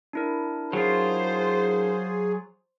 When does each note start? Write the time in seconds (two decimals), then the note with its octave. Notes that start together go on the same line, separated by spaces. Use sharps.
0.13 D4 E4 A#4
0.73 F#3 F4 G#4 C5